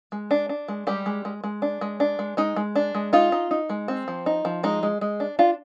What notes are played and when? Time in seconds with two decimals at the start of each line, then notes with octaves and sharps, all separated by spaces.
0.12 G#3
0.31 D4
0.49 D4
0.68 G#3
0.87 G3 G#3 G4
1.06 G#3
1.25 G#3
1.44 G#3
1.62 D4
1.81 G#3
2.00 D4
2.19 G#3
2.37 G#3 D#4
2.56 G#3
2.76 D4
2.95 G#3
3.13 D#4 F4
3.32 D#4
3.51 D#4
3.70 G#3
3.88 C4
4.08 F3
4.26 D#4
4.45 F3
4.63 G#3 D#4
4.83 G#3
5.01 G#3
5.20 D4
5.39 D4 F4